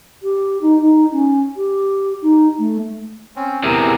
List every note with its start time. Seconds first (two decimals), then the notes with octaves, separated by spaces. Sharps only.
0.23 G4
0.61 D#4
0.80 D#4
1.11 C#4
1.56 G4
2.22 D#4
2.59 A3
3.36 C4 C#4
3.64 E2 C3 G#4 A#4 E5